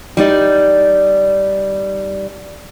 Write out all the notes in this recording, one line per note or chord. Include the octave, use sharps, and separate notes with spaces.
G3 D#4 D5